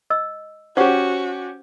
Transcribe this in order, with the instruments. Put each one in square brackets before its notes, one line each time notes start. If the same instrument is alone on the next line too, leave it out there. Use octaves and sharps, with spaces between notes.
[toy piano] D#5 E6
[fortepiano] C#4 G4 [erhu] F#4 [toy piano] C5 F#5 C#6